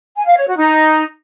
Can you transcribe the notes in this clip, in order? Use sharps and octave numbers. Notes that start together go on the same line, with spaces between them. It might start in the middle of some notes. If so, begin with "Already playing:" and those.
G#5
F5
C#5
F#4
D#4